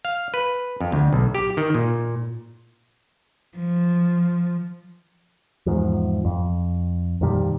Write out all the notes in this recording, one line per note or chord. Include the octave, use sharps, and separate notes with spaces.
F5
B4
F2
D2
B1
G4
D#3
A#2
F3
E2 G#2 F3
F2
F2 A#2 D#3 G3